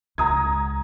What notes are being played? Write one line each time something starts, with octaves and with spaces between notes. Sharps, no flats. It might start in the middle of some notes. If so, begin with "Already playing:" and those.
C#2 A#5 D#6 G#6